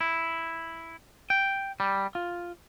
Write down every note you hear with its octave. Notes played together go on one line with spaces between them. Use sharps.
E4
G5
G3
F4